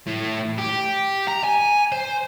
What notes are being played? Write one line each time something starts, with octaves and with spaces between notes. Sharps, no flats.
A2
G4
A#5
G#5
C5